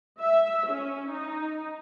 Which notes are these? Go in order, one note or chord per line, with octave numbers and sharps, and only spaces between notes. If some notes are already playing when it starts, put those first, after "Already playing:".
E5
C#4
D#4